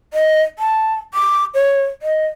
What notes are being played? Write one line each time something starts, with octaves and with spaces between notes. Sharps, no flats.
D#5
A5
D6
C#5
D#5